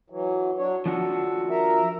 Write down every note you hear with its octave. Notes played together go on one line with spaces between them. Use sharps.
E3 F#3
F#3 D4 C#5
F3 D4 F#4 A4
A#4 E5